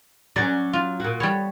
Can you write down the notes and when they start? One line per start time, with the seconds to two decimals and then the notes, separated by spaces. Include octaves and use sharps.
0.36 F#3 C#4 D5
0.73 F4
1.00 A#2 F#4
1.20 G3 B3 C#5